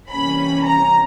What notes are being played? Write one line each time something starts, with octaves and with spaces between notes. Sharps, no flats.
C3 E3 G3 A#3 C#4 B5
A#5